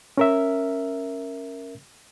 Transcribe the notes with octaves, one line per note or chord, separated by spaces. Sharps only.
C#4 A#4 E5